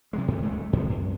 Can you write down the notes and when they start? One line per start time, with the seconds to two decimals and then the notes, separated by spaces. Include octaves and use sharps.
0.13 C3 F#3 G#3
0.28 G2 C3 E3 A3
0.42 D1 C#2 G#3 A3
0.73 F2 C3 G#3 B3
0.90 F#2